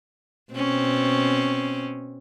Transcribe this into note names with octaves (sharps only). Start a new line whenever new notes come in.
B2 C4 C#4